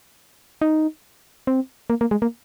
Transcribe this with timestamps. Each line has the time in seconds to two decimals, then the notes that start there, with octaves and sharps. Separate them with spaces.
0.62 D#4
1.47 C4
1.90 A#3
2.01 A#3
2.11 G#3
2.22 A#3